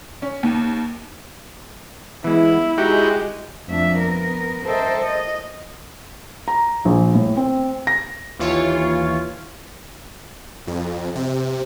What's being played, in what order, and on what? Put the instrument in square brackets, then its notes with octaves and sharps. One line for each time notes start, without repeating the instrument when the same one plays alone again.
[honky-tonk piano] C#4
D#2
[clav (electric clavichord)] E3 G#3 [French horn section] B3 [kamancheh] E4
[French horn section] G#3 [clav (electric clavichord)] D#4 [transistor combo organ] F#4 G4
[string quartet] F2 A3 D4 E5
B3 A#4
A4 A#4 C5 D#5 E5 G5
D#5
[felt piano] A#5
A#1
A2
C4
A#6
[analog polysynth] D#2 E3 F4 C#5
[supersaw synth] F2
C3